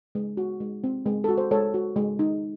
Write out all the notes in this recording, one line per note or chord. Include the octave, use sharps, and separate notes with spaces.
G#3
F#4
G#3
C4
G#3
F#4 A4
C5
G#3 A4 C#5
F#4
G#3
D#4